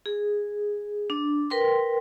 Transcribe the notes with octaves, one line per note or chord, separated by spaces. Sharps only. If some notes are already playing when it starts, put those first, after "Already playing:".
G#4
D4
A#4 B4 G5 C6